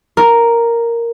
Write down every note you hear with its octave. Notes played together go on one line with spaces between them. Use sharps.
A#4